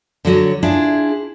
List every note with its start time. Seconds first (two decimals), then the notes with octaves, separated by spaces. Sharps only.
0.25 D3 F#3 F#4 C#5
0.63 D4 E4 F4 G#4